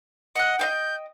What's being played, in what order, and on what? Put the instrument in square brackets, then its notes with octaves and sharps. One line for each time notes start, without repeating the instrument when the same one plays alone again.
[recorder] D#5 [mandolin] F#5 F#6
[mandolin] D#5 F5 G5 [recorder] G6